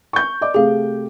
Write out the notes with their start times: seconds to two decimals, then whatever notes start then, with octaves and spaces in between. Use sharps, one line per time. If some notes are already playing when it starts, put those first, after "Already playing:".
0.13 C#6 G6
0.41 D5 D#5 D6
0.54 C3 A3 G4 G#4 F5